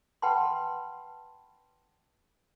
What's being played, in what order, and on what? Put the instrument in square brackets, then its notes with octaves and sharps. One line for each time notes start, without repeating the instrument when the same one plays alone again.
[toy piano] B4 F#5 G5 A5 B5 C6